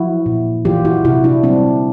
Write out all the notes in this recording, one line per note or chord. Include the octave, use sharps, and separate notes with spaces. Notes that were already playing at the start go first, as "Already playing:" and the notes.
Already playing: F3 E4 F#4
A#2
E3 F4 G4
E4 F#4
C3 E4 F#4
D4 E4
G3 C4 D4